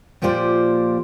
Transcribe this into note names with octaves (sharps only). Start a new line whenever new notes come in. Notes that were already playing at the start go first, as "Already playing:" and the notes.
A#2 F3 A#3 G4 C5 D5